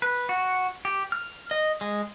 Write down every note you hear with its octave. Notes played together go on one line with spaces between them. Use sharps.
B4
F#4
G4
F6
D#5
G#3